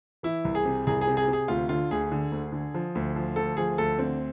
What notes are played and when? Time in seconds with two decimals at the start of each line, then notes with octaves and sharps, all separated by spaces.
0.23 E3 E4
0.45 C2
0.55 G#4
0.65 C3
0.87 C2 G#4
1.01 G#4
1.07 C3
1.17 G#4
1.28 C3
1.33 G#4
1.48 D2 F4
1.69 D3 F4
1.91 D2 G#4
2.12 D3
2.32 D2
2.52 D3
2.74 F3
2.95 D2
3.16 F3
3.36 D2 A4
3.57 F3 G#4
3.78 D2 A4
3.99 D3 C4